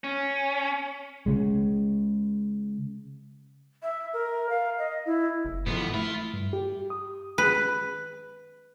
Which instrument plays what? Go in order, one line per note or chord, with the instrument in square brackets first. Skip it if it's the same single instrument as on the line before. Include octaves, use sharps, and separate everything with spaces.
[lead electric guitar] C#4
[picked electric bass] C#3 G#3
[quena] E5
A#4
F5
D#5
E4
[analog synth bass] F#1
[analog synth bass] G#2 [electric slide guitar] E3 F3 A3 [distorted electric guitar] B3
[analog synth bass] A3 [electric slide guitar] E4 [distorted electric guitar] F4
[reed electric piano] G2
G4
D#6
[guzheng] B4